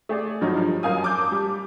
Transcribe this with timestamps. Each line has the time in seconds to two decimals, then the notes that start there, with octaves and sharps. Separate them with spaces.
0.09 A3 G#4 D5
0.41 G2 F3 F#3 D#4
0.57 F3 G3
0.83 F#2 A#4 F5 G#5 D#6
1.02 A5 D6 G6
1.32 G3